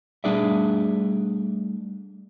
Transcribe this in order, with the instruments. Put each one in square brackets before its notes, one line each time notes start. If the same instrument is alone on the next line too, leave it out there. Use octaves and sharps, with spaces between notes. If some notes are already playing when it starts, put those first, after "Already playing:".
[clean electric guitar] G3 A3 D4 G#4 D5 E5